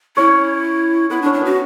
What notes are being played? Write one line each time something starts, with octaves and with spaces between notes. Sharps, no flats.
C#4 E4 C#5
B3 E4 B4
D4
C#4 C#5
D4
B3 F#4 B4